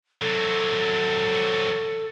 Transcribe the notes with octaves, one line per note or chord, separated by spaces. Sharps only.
C3 F#3 A4